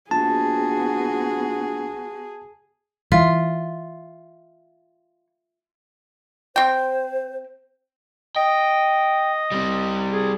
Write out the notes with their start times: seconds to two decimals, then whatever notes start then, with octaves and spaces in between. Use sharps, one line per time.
0.11 A#1 B3 F#4 G#4 A5
3.12 E3 F4 E5
6.56 C4 C5 G5
8.36 D#5 G5
9.52 G3 C4
10.11 G#4